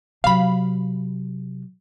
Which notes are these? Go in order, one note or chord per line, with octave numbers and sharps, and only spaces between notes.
C3 F#3 F5 B5